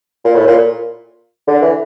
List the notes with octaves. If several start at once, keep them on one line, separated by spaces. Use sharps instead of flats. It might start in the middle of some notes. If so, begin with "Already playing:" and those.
A#2
A2
A#2
D3
E3